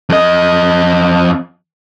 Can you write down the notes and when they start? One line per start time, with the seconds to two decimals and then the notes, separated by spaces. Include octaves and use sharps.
0.10 F2 D#5